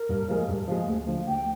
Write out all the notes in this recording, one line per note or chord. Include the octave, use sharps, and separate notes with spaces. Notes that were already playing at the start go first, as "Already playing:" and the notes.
Already playing: A#4
G2
F3 G#3
G2
F3 G#3
D2
D3 F3
D2 G5